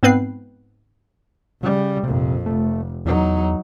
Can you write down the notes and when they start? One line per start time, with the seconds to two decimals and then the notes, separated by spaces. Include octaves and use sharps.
0.03 G#2 B3 C4 B4 C7
1.61 C#3 G3
2.04 A#1 F2 C3
2.46 F1 A3
3.05 E2 F#3 D#4